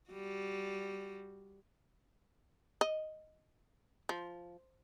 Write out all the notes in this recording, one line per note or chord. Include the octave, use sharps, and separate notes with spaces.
G3 F#4
D#5
F3